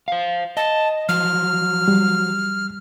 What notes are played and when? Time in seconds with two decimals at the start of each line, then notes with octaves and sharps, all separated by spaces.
0.08 C5 F5
0.57 D#5 A5
1.09 F3 F#3 F6
1.88 G3